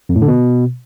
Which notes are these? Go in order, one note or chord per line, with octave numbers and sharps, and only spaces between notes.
F2
A2
D3
B2